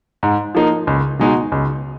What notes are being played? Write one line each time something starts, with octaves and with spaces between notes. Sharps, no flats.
G#2
F3 A#3 D#4
C#2
B2 G#3 D#4 F#4
C#2